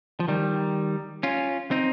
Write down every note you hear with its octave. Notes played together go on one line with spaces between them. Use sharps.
F3
D#3 G3
C#4 F4
C4 D#4